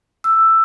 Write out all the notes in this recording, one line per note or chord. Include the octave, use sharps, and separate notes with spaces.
E6